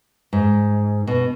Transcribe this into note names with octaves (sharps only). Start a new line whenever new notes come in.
G#2
B2